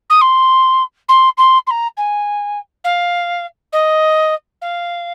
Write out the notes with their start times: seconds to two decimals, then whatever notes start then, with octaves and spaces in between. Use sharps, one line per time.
0.10 D#6
0.21 C6
1.09 C6
1.37 C6
1.67 C6
1.70 A#5
1.97 G#5
2.84 F5
3.72 D#5
4.61 F5